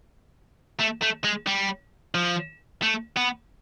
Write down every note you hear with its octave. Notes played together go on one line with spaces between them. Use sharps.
A3
A3
G#3
G3
F3
A3
B3